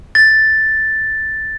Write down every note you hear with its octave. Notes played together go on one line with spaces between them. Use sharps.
A6